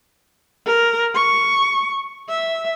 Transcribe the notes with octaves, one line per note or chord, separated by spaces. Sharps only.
A#4
C#6
E5